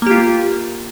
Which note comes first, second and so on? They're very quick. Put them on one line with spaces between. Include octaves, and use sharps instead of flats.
A#3 G4 F4